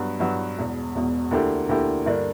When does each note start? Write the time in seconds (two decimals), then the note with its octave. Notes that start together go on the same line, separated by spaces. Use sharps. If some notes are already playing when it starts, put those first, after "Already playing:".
Already playing: G2 F#3 B3
0.20 G2 F#3 B3
0.57 E1 E2 B2
0.95 E1 E2 B2
1.31 D2 D3 A#3 E4 G4
1.69 D2 D3 A#3 E4 G4
2.06 G2 D3 A#3 D4